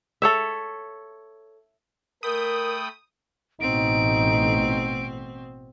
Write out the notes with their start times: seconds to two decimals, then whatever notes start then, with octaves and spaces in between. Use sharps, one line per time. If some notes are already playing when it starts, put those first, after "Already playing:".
0.22 A4 C#5 E5
2.23 A3 A#4 G5 B5 D#6
3.61 A1 B2 C4 D#4 D7